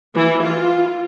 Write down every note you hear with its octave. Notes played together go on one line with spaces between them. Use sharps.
E3
F4